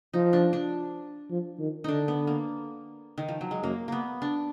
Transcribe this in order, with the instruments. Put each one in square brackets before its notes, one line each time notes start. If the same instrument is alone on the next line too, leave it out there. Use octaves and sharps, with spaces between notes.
[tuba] F3 [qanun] D#4
[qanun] D4
D4
[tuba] F3
D#3
[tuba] D3 [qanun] D4 D#4
[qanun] B3
A#3
D#3
F3
F#3
G#3
[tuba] F#2 [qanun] A#3
[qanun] A#3 B3
D4